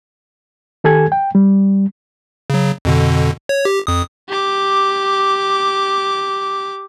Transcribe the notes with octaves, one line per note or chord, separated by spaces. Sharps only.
D#3 G4 A4 G#5 G#6
G5
G3
C#3 F#3
F2 B2 D3
C#5
G4
F2 D#6
G4 D6